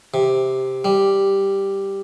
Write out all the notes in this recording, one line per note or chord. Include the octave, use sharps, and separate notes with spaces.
C3
G3